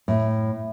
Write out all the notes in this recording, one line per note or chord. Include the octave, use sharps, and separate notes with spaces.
A2